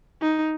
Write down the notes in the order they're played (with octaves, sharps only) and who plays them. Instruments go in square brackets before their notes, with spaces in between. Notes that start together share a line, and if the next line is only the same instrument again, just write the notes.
[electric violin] D#4